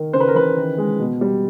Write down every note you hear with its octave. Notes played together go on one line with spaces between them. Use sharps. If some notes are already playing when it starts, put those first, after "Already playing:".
Already playing: D#3
C#3 C5
B4
A#4
E3 B4
D#3
G#3
B2
G3